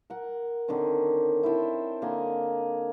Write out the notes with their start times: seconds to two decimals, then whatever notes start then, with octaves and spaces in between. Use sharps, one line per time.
0.10 A#4 F#5
0.68 D3 D#3 C4 C#4
1.43 E4 C5 G5 A5
2.02 D3 A#3 D#5 G#5